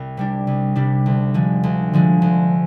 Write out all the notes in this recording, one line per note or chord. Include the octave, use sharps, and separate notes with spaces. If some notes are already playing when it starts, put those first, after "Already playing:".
Already playing: C2
C3 G3 D4
C2
C3 G3 D4
D2
D3 F3 G#3
D2
D3 F3 G#3
D2